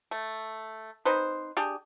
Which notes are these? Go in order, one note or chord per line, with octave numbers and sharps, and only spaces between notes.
A3
C4 D#4 B4 C5
D4 G4 G#4